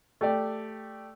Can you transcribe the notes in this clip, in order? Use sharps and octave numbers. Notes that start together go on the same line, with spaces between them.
A3 G4 D5